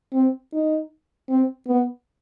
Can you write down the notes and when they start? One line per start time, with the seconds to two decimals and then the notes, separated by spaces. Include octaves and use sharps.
0.13 C4
0.53 D#4
1.30 C4
1.68 B3